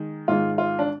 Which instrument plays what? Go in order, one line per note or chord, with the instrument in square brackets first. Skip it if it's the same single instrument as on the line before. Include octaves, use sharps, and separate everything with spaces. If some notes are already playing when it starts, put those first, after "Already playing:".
Already playing: [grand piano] D#3 G#3
[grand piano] G#2 D#3 G#3 [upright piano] F4
[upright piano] F4
D4